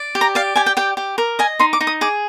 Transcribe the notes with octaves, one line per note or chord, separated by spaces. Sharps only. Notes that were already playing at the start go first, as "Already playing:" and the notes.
Already playing: D5
G4
A#5
D5 F5
G4 G#5
G5
G4 G5
G4
A#4
D#5 G#5
D#4 C6
D6
D#4
D#6
G#4 D6